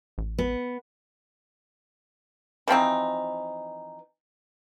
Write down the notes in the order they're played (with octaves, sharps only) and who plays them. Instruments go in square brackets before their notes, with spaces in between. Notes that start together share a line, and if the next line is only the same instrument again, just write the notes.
[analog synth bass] A1
[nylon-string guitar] B3
[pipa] E3 F3 C4 D#4